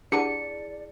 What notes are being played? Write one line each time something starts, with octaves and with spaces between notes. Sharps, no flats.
D4 E4 G4 G#4 D5 F#5 A5 C#7